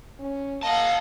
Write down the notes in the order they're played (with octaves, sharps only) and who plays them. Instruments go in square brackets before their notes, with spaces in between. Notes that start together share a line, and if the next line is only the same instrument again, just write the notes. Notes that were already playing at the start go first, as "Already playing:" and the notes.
[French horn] C#4
[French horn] A#3 [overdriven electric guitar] G#4 A5 [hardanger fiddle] D#5 F#5 [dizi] F5